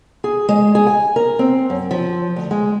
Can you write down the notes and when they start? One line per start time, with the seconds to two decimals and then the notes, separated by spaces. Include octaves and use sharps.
0.24 G#4
0.49 G#3
0.75 G#4
0.87 G#5
1.16 A#4
1.39 C4
1.70 F#2
1.91 F3
2.36 D2
2.51 G#3